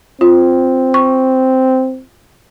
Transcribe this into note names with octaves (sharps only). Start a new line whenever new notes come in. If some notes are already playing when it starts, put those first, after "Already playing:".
C4 F4
C#6